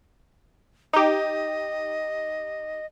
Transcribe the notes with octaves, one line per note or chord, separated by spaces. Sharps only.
D#4 G4 D#5